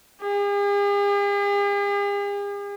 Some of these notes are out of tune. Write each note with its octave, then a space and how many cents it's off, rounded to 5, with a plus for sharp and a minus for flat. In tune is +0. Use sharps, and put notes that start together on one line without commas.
G#4 -45